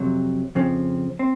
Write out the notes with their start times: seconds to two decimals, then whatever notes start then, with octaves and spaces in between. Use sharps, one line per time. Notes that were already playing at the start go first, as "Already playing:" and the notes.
Already playing: F2 C3 F#3
0.55 F2 C#3 F3 C4
1.19 C4